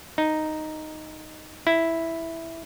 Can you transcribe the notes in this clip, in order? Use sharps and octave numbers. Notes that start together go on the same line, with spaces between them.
D#4
E4